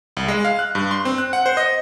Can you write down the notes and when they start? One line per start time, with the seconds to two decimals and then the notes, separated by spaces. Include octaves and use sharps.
0.17 C2
0.28 G#3
0.45 F5
0.59 F#6
0.75 G2
0.91 C6
1.05 C4
1.18 F#6
1.33 F#5
1.46 C5
1.57 D#5